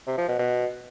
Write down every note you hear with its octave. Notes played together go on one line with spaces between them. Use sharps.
C3
F3
B2
B2